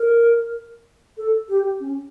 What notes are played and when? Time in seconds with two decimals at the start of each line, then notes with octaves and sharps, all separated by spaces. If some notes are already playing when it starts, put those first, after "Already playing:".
Already playing: A#4
1.17 A4
1.49 G4
1.80 C#4